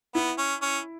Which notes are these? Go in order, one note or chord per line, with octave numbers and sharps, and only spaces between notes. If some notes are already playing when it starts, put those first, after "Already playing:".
B3 E4
C#4
C#4